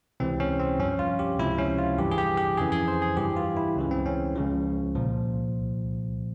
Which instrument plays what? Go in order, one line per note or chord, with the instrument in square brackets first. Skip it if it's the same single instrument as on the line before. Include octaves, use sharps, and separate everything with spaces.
[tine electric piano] C#2 C3 E3 C4
C#4
C4
G2 F3 C#4
F4
G4
C#2 C3 F3 E4
C#4
F4
G2 E3 G4
G#4
G4
G4
F2 C#3 E3 G#4
G#4
C5
G#4
G2 E3 G4
F4
E4
C#2 C#3 E3
C4
C#4
C#2 C#3 F3
C2 A#2 F3